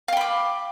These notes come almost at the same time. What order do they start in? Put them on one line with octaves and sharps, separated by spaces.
F5 G5 B5 D6